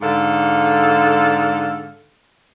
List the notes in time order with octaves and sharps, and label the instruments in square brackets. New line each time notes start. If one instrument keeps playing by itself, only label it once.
[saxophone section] G#2 D3 A4 F5